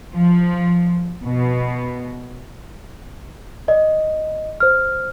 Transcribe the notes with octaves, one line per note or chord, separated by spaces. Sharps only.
F3
B2
D5 D#5
C5 F6